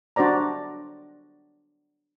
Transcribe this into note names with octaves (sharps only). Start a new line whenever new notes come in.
D4 F#4 C5 D5 A#5